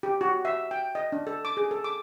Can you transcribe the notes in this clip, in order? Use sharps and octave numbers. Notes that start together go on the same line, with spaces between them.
G4
F#4
E5
G5
D#5
D4
A4
D6
G#4
A4
D6